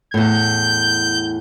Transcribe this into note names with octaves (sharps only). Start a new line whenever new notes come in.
E2 A2 G6